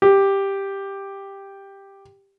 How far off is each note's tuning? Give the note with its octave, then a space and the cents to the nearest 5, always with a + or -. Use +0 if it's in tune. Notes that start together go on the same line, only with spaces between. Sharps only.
G4 +5